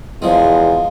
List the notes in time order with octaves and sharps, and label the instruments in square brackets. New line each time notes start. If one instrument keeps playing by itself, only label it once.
[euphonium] E2 [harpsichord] F3 G#3